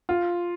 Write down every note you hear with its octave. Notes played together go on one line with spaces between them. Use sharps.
F4